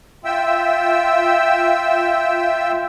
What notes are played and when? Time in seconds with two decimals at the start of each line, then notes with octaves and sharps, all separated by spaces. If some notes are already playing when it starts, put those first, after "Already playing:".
0.25 F4 E5 G5 E6